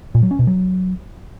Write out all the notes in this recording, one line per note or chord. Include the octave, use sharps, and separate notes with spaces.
A#2
F#3
C#4
B2
F#3